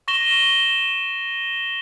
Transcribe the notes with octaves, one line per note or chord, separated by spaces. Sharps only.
C#6 A#6 E7 G7